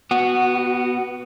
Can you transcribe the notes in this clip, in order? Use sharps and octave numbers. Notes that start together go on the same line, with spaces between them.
B3 F#4